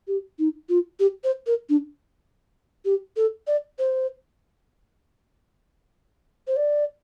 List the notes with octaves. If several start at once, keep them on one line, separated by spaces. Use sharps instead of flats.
G4
D#4
F4
G4
C5
A#4
D4
G4
A4
D5
C5
C5
D5